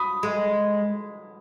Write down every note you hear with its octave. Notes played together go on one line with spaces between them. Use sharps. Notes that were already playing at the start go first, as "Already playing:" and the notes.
Already playing: B5 D#6
G#3